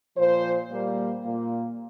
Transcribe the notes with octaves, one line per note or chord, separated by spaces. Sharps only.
A#2 F3 A#3 C5
A#2 G3 A#3
A#2 A#3